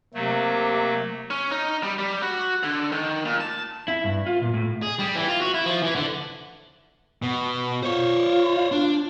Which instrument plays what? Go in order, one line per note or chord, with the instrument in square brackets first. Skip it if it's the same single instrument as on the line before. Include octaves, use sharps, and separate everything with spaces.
[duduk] C3 [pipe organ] F#3 A3 [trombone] A#3
[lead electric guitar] C#4
D#4
G3
G3
F#4
D3
D#3
A#2
A5
[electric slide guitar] E4
G2
F4
A#2
A2
[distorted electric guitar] G#4
G3
E3
F4
F#4
E4
F3
E3
D3
B2
[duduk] F4 [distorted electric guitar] C5 C#5
[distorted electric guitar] D4